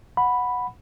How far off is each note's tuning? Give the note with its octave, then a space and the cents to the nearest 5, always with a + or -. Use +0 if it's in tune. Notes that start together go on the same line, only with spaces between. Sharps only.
F#5 -10 B5 +0